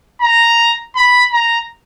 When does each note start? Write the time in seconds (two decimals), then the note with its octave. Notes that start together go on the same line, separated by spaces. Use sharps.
0.21 A#5
0.96 B5
1.32 A#5